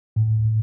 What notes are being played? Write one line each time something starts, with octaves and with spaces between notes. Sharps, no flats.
A2